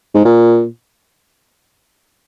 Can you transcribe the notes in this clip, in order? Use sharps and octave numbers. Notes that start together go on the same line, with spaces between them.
G#2
A#2